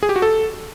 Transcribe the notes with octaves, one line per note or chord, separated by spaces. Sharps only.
G#4
G4
F#4
A4